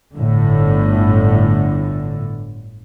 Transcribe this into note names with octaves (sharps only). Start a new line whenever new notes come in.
G1 A2 D3